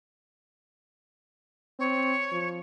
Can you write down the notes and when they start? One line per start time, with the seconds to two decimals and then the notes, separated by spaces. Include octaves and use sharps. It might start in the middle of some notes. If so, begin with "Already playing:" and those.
1.79 C4 C#5
2.32 F3